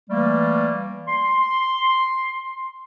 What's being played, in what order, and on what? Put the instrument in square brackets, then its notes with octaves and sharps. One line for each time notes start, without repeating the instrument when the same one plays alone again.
[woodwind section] E3 G3 A3 A#3
C6